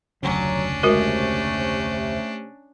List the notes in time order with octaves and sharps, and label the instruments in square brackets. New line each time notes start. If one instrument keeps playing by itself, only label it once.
[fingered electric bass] F1 D2 C#3 [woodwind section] F#3 [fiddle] C#4 D4
[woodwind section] C3 A3 [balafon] G#3 F#4 A#4